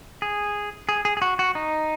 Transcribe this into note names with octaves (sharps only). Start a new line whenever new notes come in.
G#4
G#4
G#4
G#4
F#4
F#4
D#4